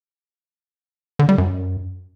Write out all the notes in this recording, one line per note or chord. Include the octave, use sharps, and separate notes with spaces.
D3
G3
F#2